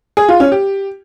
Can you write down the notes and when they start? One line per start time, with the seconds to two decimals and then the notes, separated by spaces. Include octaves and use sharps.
0.17 G#4
0.28 F4
0.40 C#4
0.52 G4